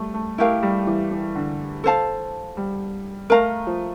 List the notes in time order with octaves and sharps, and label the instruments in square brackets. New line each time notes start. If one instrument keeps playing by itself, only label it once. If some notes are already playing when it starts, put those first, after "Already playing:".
Already playing: [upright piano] G3 A3
A3
[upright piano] A3 [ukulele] E4 G4 A#4 F5
[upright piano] G3
E3
E3
D3
[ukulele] A4 C5 F5 A5
[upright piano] G3
[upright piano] A3 [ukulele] A#4 F5 A#5
[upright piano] F3